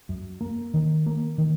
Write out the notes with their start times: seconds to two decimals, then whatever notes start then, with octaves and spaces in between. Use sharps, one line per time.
0.09 F#2
0.41 A#3
0.74 D#3
1.06 A#3
1.38 D#3